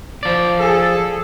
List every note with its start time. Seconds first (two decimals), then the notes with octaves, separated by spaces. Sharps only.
0.23 F3 D5
0.59 G#4 A4